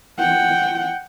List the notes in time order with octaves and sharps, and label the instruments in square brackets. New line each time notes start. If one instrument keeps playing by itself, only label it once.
[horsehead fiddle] F#5 G5